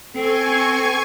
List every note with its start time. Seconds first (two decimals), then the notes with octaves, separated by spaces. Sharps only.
0.15 C4 A4 G#5 C#6 G#6